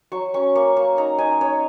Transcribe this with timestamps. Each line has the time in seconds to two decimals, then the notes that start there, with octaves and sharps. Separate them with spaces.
0.12 F#3 C#6
0.34 C#4 C#6
0.55 A#3 C#6
0.77 A#3 C#6
0.97 D#4 A#5
1.18 D#4 G#5
1.41 D#4 C#5